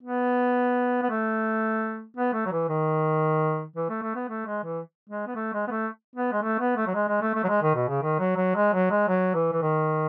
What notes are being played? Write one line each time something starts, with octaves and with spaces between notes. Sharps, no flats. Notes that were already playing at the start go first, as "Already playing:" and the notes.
B3
B3
A3
B3
A3
F#3
E3
D#3
E3
A3
A3
B3
A3
G#3
E3
G#3
B3
A3
G#3
B3
A3
B3
G#3
A3
B3
A3
F#3
G#3
G#3
A3
A3
F#3
G#3
D#3
B2
C#3
D#3
F#3
F#3
G#3
F#3
G#3
F#3
E3
E3
D#3